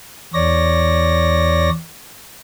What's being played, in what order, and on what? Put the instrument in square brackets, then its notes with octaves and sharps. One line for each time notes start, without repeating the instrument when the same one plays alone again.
[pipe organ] E2 C#5 D5 A#6